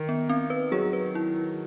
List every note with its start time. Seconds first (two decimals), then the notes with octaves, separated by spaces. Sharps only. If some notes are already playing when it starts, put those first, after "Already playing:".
Already playing: D#3
0.09 B3
0.29 C4
0.50 B4
0.72 F#3 G#4
0.93 B4
1.15 E4